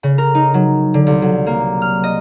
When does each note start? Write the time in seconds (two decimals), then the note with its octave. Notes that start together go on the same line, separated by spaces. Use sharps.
0.03 C#3
0.18 A#4
0.35 D#4
0.54 F#3
0.94 D3
1.07 C2
1.22 F#3
1.46 A#3
1.82 F6
2.04 D#5